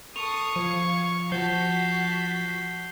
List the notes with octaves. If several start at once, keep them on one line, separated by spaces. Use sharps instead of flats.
A4 C#6 D#6 C7 F7
F3 F5 G#6 C#7
F3 F#4 A5 G6 B6 C7 G7